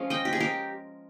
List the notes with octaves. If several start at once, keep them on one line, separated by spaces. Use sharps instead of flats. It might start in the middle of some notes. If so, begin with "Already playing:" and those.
Already playing: F3 G#3 C#4 F5
D#5 G5
G4
G#4
G4 A#4